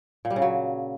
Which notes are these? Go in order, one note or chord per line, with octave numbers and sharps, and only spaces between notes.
A#2
G3
C#3
F#3